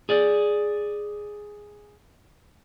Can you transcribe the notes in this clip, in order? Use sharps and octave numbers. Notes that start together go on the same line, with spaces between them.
G#4 D5